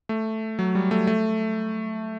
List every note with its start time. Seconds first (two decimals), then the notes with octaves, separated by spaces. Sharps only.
0.09 A3
0.59 F#3
0.75 G3
0.91 A3
1.07 A3